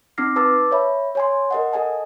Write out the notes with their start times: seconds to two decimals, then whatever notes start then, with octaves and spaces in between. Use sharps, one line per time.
0.18 C4 D#4 D6 F6 A#6 C7
0.36 B4 A5 D6 E6 A6
0.71 C#5 E5 B5
1.15 C#5 G#5 C6
1.51 A#4 D#5 F#5
1.72 A4 D#5 G#5 A5